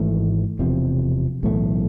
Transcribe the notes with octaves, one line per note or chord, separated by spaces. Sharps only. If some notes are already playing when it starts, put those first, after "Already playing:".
Already playing: G#1 G#2 E3 A3
E1 E2 C3 F3
B1 A2 E3 A3